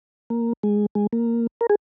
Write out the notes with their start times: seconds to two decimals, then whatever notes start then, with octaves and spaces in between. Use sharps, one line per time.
0.30 A#3
0.63 G#3
0.95 G#3
1.13 A#3
1.61 A#4
1.69 G#4